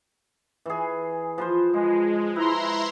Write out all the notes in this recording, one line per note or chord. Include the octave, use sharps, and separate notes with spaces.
E3 G#4
F3 B4 C5
F3 G#3
E4 B4 A#5 C6